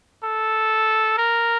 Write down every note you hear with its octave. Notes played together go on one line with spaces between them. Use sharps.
A4
A#4